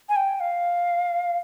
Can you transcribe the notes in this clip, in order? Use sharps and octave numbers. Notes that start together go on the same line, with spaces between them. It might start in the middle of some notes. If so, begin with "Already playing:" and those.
G#5
G5
F5